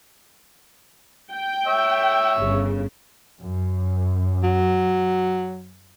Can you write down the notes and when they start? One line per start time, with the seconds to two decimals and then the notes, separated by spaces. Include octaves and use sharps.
1.32 G5
1.67 C#5 E5 E6
2.39 G1 C#3
3.41 F#2
4.43 F#3